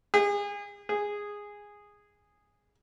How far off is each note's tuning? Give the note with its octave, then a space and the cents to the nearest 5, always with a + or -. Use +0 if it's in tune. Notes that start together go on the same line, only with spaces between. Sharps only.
G#4 -35
G#4 -10